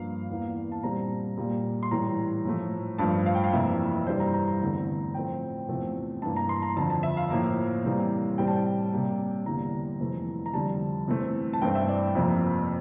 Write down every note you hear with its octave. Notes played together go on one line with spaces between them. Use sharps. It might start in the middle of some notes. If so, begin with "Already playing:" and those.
Already playing: G2 F3 A#3 F5
E2 E3 A#3
A5
A#2 G3 C4 A#5
A#2 G3 A#3
C6
A2 E3 G3 A#5
A2 F3 A3
G2 F3 A3 A5
F5
G5
F5
F2 C3 E3 A#3 E5
G2 E3 G3 C5
A#5
A#5
A#5
E2 D3 A3 C4
A2 F3 A3 C4 G5
E2 C3 F3 A3 C4
G2 E3 A#3 A5
A#5
C6
A#5
F2 D3 F3 A5
A5
E5
F5
A2 F3 A#3
C3 E3 G3 A#3
A2 G3 C4 G5
A5
G5
C3 G3 A#3
E2 D3 G3 A#3 A#5
F2 C3 E3 A3
A#5
F2 D3 G3 A5
C3 E3 A3 C4
A5
G2 E3 A3 C4 G5
E5
D5
F2 C3 F3 A#3 C5